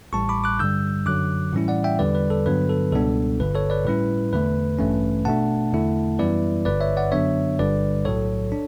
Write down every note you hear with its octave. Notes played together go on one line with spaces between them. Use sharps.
A1 A2 G3 A5 C#6
B5 D6
D6 F#6
G2 D3 G3 E6 G6
F#2 D3 F#3 D6 F#6
A2 E3 G3 C#4 E4
D5 F#5
E5 G5
E2 D3 G3 B4 D5
B4
A4
G2 D3 F#3 B3 B4
A4
C#2 B2 G3 B3 D4 A4
G1 G2 D3 B4
A4 C#5
B4 D5
A2 G3 C#4 E4 B4
E2 D3 A3 B4
A1 G2 E3 A3 C#4
B2 A3 D4 F#5 A5
E2 D3 A3 E4
F#2 E3 G3 B3 E4 B4 D5
G1 G2 D3 B4 D5
C#5 E5
D5 F#5
F#2 D3 F#3 B3 D4 C#5 E5
G1 G2 D3 G3 B4 D5
B1 A2 F#3 A4 C#5
D4